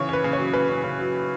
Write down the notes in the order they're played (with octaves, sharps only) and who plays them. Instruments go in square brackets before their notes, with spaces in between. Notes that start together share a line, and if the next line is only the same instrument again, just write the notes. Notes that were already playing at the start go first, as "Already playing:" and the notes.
Already playing: [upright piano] C#3 E3 C#5
C#4 B4
C#3
C#5
F#3
C#3 B4
C#4
C#3
F#3